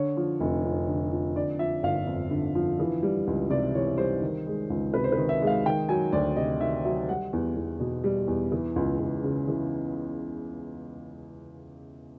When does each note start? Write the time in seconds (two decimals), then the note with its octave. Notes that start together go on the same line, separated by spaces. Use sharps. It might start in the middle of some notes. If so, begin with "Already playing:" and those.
Already playing: D3 C#5
0.17 F3
0.40 F1
0.64 F2
0.88 D3
1.12 F3
1.36 D3 D5
1.59 F3 E5
1.83 G1 F5
2.07 F2
2.31 D3
2.55 F3
2.80 E3
3.03 G3
3.27 C#2
3.50 C3 D5
3.75 E3 C#5
3.98 G3 C5
4.22 D#3
4.47 G#3
4.70 C#2
4.94 C3 B4
5.04 C5
5.12 D#3 B4
5.29 E5
5.42 G#3
5.47 F5
5.65 D#3 G5
5.89 F#3 G#5
6.13 D2 D5
6.36 C3 D#5
6.61 D#3 E5
6.85 F#3 E5
7.09 G3 F#5
7.33 E2
7.56 E2
7.80 B2
8.04 G3
8.28 E2
8.52 E3
8.76 C#2
9.00 C#2
9.23 C#3
9.48 E3